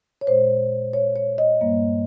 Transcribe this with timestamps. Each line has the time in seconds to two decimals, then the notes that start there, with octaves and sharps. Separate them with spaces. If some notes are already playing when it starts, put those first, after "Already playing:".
0.21 C#5
0.27 A#2 G#3 C5
0.94 C#5
1.16 C#5
1.38 D#5
1.61 G2 G3 A#3